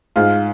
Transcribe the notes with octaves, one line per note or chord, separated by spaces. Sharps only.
G#2 F4